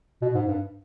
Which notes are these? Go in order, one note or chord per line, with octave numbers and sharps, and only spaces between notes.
B2
G#2
G2